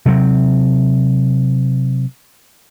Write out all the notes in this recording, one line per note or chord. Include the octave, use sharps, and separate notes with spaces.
C3 F#3 C4